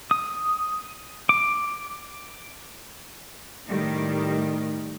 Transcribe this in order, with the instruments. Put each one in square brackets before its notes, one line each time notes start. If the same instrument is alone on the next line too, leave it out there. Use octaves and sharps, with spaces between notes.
[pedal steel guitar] D#6
D6
[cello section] A2 D#3 G3